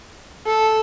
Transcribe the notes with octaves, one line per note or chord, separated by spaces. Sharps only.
A4